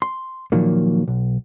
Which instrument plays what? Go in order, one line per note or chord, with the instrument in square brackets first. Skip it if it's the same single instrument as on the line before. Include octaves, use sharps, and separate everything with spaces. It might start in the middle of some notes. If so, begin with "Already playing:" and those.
[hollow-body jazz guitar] C6
A#2 D#3 F3 F#3 A#3
B1